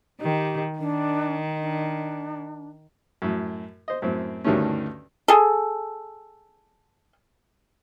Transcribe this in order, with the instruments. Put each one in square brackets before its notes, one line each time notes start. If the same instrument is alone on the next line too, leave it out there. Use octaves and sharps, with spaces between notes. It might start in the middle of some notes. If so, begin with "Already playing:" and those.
[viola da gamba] D#3 [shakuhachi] G4
[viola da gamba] D#3 [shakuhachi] D4
[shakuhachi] D4
[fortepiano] F#2 A2
C5 D#5
F#2 A2 C4
D2 G2 D#3 G3 A3 C#4
[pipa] G#4 A4